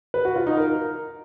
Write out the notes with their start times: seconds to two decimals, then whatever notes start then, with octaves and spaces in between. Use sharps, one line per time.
0.14 B4
0.25 F#4
0.36 F4
0.47 D#4
0.58 A#4